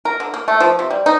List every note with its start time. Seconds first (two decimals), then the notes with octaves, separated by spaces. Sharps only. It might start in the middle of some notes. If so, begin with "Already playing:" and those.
0.05 A#4
0.20 D3
0.34 A#3
0.48 A3
0.60 F3
0.79 C3
0.90 G3
1.06 D#4